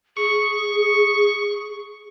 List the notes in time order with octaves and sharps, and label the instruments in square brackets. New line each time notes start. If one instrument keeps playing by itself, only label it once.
[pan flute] G#4 [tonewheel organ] C#6